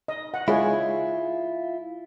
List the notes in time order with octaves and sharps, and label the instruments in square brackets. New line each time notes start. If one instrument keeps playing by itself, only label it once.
[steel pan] D#5
F#5
[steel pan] G#3 G#4 C#5 [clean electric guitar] E4 F4